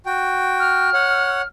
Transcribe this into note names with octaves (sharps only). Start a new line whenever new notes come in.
F#4 G5
F6
C#5 F#5